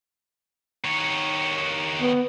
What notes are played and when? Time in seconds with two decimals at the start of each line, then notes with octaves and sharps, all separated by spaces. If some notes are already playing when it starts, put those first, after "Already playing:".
0.85 D#3 C#5
2.02 B3